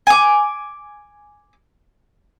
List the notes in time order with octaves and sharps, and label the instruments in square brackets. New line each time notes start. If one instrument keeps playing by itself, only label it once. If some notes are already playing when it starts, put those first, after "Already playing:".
[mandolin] G#5 D6